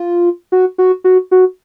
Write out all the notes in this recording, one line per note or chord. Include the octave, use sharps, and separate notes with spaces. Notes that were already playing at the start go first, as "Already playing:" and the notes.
Already playing: F4
F#4
F#4
F#4
F#4